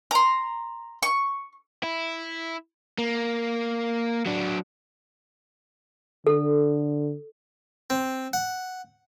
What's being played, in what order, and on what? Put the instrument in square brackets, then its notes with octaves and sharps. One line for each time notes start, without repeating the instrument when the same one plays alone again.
[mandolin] A#5 C6
C#6
[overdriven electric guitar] E4
A#3
F#3 D4
[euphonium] D3 [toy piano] A4
[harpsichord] C4
F#5